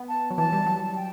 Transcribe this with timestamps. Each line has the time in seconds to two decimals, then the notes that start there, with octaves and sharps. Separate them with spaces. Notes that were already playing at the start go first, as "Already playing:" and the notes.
Already playing: B3
0.09 A5
0.30 F#3
0.37 E3 A5
0.52 G3
0.66 F#3
0.91 A5
0.96 G5